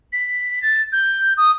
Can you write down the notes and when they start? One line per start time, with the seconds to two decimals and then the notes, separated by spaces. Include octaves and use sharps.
0.13 B6
0.62 A6
0.93 G6
1.37 D#6